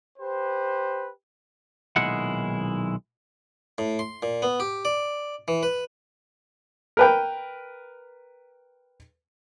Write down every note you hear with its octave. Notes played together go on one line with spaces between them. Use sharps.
G4 B4 C5
B1 A#2 D#3 G#3 E4 F#5
A2
C6
A#2
B3
G4
D5
E3
B4
A#4 B4 G5